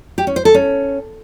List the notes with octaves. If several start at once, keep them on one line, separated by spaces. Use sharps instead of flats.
G4
C#4
C5
A4
C#4